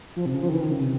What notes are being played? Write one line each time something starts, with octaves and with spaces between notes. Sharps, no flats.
F3
C3
C#3
F3
D#3
E3
D#3
C#3
C3